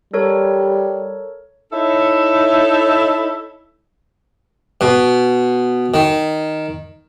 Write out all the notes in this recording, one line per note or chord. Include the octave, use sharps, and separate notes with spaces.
G3 A4 A#4 C#5
D#4 E4 A4 C#5 E5
B2
D#3